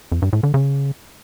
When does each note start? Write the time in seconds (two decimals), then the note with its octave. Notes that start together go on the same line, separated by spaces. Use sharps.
0.12 F2
0.22 G2
0.33 A2
0.43 D3
0.54 C#3